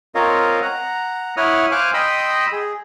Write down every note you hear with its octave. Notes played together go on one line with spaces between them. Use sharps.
C4 F4 A#4 C#5 D#5 F5
F#5 A#5
E4 C#5 F#5 D#6 F6
C5 F5 G#5 D6 F6 F#6
D#5 G5 B5 C6 D#6 E6
G#4